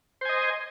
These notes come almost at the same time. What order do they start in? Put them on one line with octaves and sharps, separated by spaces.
C5 G#5 D#5